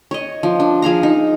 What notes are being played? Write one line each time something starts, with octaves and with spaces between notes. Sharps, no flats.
C#5 D#5
F3
D4
F3 G#4 F5 A#5
D#4